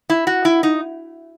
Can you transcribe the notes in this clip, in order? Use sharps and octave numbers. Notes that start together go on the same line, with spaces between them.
E4
F#4
E4
D#4